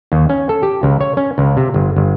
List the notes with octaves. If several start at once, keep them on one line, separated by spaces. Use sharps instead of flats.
D#2
C#4
A4
G4
C#2
C#5
C#4
C#2
C3
G1
G1